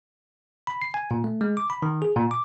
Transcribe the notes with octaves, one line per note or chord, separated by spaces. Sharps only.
B5
C7
G#5
A#2
A3
G#3
D6
B5
D#3
G#4
A#2
D6